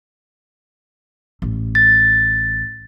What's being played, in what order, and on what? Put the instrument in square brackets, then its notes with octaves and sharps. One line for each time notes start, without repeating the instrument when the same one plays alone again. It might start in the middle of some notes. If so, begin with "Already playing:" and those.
[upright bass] A1
[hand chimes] A6